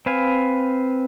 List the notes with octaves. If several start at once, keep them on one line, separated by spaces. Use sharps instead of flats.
C4 B4 F5 G#5